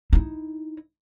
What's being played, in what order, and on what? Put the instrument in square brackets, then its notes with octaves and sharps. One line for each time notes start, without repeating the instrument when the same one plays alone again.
[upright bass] D#4 E4